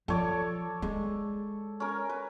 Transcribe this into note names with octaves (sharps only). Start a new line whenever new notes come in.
F3 A4 C#5 D5
G#3
C#4 A#4
B4